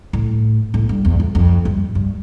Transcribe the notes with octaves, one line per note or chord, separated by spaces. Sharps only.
A2
A2
G2
E2
F2
F2
G2
G2